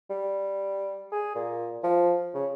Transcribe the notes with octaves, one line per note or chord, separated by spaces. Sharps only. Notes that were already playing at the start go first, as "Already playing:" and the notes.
G3
G#4
A#2
F3
C#3